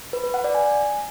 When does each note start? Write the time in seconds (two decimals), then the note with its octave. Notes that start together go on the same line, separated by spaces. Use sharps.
0.13 B4
0.24 B4
0.34 F#5
0.44 D5
0.55 G#5